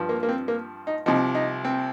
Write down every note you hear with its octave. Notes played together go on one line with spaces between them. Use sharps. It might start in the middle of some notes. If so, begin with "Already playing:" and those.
Already playing: G2 F3
A#3
A#3
C4
A#3
D#4
C2 C3 F3 D#4
D#4
C4